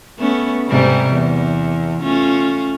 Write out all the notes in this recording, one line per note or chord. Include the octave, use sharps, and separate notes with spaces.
A3 B3 C#4
G#2 C3 G3
E2
A3 C#4 F4